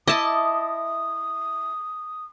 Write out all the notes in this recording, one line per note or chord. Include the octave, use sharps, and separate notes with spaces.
E4 D#5 E5 A5 D6 D#6